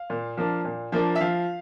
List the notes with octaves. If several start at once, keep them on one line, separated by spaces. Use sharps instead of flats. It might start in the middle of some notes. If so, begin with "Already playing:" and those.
Already playing: F5
A#2
F3 A#3 D4
A#2
F3 A#3 D4
E5
F3 F5